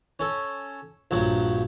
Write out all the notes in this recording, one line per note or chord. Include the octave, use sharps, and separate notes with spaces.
C#4 A4
A#1 G2 F#3